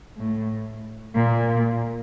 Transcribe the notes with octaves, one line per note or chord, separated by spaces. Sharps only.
A2
A#2